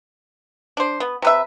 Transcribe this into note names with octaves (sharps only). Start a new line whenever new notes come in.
D4 C5
B3
C3 B4 E5